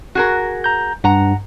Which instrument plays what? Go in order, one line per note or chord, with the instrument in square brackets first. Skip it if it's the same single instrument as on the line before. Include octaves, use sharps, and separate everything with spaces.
[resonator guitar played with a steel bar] F#4 G#4 A#4
[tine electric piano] A#5 G6
[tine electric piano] G2 [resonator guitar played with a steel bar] F#5 A#5